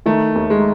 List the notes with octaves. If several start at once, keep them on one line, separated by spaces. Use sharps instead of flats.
D#3 A3
D#2
G#3